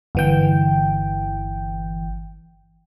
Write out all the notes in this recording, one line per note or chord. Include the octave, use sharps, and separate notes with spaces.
G1 E3 G5